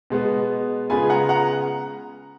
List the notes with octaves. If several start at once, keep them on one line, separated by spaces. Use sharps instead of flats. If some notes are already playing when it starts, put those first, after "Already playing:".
B2 G#3 B3
C#3 G#3 B3 F4 G#5 B5
F#5 A#5
F#5 A#5